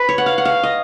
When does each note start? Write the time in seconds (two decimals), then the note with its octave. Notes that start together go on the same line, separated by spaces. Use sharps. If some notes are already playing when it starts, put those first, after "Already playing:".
Already playing: B4
0.09 C#5
0.18 F#5
0.26 F5
0.38 F#5
0.45 F5
0.63 D#5